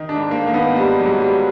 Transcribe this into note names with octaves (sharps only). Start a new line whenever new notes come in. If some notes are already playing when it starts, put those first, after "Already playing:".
Already playing: D#3 D#4
D4
G#2
A#3
D#3 A#3
B3
G#2 G3
F#3
G#2
G3